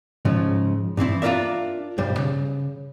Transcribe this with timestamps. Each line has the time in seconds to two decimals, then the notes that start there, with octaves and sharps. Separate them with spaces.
0.25 G#2 C#3 F3
0.97 G2 E3 C4 E4
1.22 D4 F4 G4 A#4 D5 E5
1.98 B1 G2 G3 C5
2.17 C#3